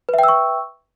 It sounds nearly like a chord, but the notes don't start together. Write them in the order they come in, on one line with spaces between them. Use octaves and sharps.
B4 E5 G5 E6 C#6